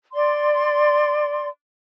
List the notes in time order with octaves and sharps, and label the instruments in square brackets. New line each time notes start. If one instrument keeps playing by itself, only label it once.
[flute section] D5 C6